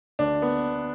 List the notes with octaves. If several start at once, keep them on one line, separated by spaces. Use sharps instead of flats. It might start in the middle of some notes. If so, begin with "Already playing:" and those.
D2 D4
B3